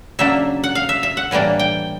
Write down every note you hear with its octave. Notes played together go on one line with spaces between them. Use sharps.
C#3 F#3 A#3 D4 E5
F#5
F5
E5
E5
F#5
A2 E3 G3 A#3 D4
G5